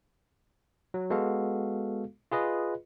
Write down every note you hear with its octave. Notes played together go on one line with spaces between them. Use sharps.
F#3
G#3 B3 F#4 A4 F5
F4 G#4 B4 D#5